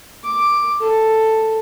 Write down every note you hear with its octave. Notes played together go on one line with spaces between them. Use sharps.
D6
A4